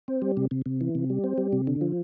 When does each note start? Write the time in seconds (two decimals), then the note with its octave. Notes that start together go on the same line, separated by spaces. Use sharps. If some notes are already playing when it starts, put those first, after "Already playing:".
0.08 C4
0.22 G3
0.37 C3
0.51 C3
0.66 C3
0.81 E3
0.95 C3
1.10 G3
1.24 C4
1.38 G3
1.53 C3
1.67 D3
1.81 F3